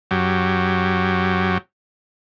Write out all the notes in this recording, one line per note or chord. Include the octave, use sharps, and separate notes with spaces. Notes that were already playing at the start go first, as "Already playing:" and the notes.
F#2 F#3 G4